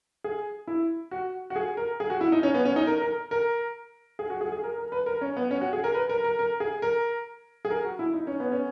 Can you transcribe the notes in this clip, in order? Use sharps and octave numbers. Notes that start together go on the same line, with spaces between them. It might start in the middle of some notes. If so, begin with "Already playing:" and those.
G#4
E4
F#4
F#4
G#4
A#4
G#4
F#4
E4
D#4
C#4
B3
C#4
D#4
A#4
A#4
A#4
G#4
F#4
G#4
G#4
A#4
A#4
B4
A#4
C#4
B3
C#4
F#4
G#4
A#4
B4
A#4
A#4
A#4
G#4
A#4
G#4
A#4
F#4
E4
D#4
C#4
B3
C#4